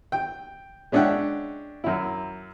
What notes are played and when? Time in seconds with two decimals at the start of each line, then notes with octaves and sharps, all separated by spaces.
0.12 G5
0.92 G#3 C#4 D4 E5 F#5 G5
1.84 F#2 E4